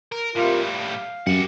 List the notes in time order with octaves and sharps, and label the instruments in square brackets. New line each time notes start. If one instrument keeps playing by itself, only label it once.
[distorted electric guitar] A#4
[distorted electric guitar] A2 G3 [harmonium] C3 F4 A#4
[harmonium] F5
[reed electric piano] F#2 [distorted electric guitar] G4 F#5